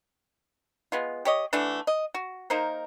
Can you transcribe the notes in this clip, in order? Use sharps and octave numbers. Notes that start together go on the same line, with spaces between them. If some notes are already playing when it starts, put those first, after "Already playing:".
G#3 B3 F4
G4 C#5 D#5
D3 E3 A3 D4
D#5
F#4
A#3 D#4 A#4 C5